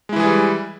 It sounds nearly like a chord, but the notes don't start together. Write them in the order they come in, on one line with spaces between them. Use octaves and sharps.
G#3 E4 E3 G#4 G3